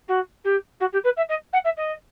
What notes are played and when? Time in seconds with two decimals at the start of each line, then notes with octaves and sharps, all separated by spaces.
0.08 F#4
0.44 G4
0.80 F#4
0.92 G4
1.04 B4
1.16 E5
1.29 D#5
1.53 F#5
1.64 E5
1.77 D#5